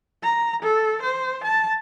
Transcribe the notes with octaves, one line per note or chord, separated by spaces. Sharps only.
A#5
A4
C5
A5